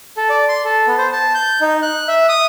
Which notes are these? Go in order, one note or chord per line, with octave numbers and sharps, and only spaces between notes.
A4
D5
C6
A4
B3
C5
A5
G6
D#4
F#6
E5
D#6